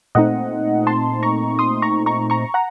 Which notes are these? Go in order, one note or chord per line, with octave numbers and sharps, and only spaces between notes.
A#2 A3 C4 D#4 D#5 F#5
A5 C6
A#5 C#6
C6 D#6
A#5 C#6
A#5 C#6
A#5 C#6
F#5 A#5